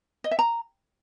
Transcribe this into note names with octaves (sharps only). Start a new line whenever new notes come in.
D#5
E5
A#5